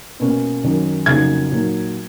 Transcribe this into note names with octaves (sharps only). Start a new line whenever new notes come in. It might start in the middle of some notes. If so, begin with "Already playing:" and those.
B2 A#3 C#4
F#2 D#3 F#3 C#4
F2 C#3 F#3 A#3 D#4 G#6
A#2 F#3 A#3 D#4